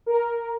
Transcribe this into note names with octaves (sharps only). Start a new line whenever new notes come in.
A#4